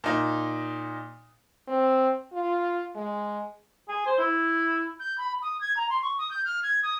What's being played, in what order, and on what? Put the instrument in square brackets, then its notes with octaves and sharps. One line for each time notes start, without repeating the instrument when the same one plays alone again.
[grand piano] A#2 D#4
[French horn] C4
F4
G#3
[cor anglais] G#4
C5
E4
[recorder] G6
B5
D#6
G#6
A#5
C6
C#6
D#6
G6
F6
G#6
D#6